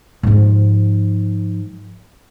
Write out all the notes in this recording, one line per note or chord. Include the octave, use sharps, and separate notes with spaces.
G#2 F3